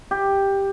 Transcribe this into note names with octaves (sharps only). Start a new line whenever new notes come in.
G4